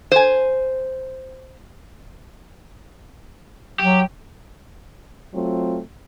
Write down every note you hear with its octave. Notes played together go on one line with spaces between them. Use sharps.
C5 G#5
F#3 G4
F#3 A3 C4 F4